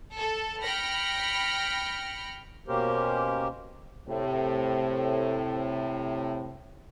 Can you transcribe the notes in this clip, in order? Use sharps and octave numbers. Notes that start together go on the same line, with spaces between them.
A4
G5 B5 F6 A#6 C#7
B2 A#3 C#4 G4 A#4 C5
A2 C3